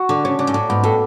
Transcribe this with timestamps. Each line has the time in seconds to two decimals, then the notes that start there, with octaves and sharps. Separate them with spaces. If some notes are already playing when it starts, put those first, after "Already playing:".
Already playing: F#4
0.09 D3 D4
0.24 C#3 C#5
0.39 C#3 D4
0.47 G#2
0.54 A2 D4
0.69 G#2 B3
0.83 A2 A4